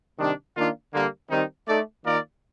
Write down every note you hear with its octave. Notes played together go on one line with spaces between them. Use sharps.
C3 D#3 G3 D4
D#3 A#3 D4 F4
D3 G3 A#3
D#3 G3 C4 D#4
A3 D#4 A4 D5
D#3 A#3 F4 A#4 D5